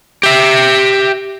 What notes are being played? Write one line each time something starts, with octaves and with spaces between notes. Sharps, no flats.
G4 E5